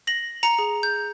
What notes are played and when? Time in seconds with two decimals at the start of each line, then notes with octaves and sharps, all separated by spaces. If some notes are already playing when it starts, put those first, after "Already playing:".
0.07 A#6 F#7
0.43 A#5 C#7
0.59 G#4
0.83 G6